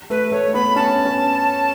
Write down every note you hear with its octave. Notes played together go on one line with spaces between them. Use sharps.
A3 B4
A3 C#5
B3 B5
C#4 A5
C#4